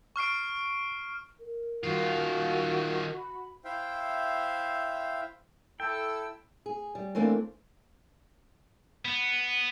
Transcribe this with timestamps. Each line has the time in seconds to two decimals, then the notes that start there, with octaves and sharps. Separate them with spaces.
0.16 C#6 F6 C7 D7
1.40 A#4
1.84 D#3 F4 F#4
3.18 B5
3.64 E4 C5 E5 F5 G5
5.80 E4 A4 G5 E6
6.66 G#4
6.95 G3
7.15 E3 A3 A#3 C4 D4
9.05 B3